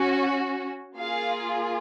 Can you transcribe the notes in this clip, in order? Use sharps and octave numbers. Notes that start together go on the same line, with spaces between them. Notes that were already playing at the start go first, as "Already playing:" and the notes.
Already playing: C#4 F#4
A#3 F4 G#4 F5